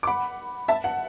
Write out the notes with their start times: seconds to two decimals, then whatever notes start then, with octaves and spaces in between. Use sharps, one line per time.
0.03 D6
0.07 F#5 B5
0.68 E5 A5
0.84 F#5